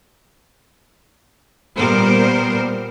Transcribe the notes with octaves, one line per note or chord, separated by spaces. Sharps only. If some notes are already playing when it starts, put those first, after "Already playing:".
A#2 G3 B3 A#4 C5